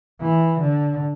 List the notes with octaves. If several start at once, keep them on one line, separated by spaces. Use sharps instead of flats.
E3
D3